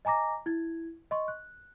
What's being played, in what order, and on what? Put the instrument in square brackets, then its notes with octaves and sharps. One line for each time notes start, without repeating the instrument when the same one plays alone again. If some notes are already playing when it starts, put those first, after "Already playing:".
[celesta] D#5 G#5 A#5 D6 A#6
E4 G#6
D#5 C6 C#6
F#6